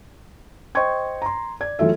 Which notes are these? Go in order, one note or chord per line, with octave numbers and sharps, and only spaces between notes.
C5 D#5 G5 C6 C#6 G#6
A#5 C6
D5 G#6
E3 F#3 A3 F4 A4 E5